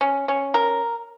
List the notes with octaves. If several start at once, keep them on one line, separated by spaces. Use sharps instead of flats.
C#4
C#4
A#4